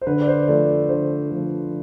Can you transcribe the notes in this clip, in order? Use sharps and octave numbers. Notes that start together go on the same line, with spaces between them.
C5
D3 B4
D5
C5
F3 A3 D5
D3 C5
F3 A3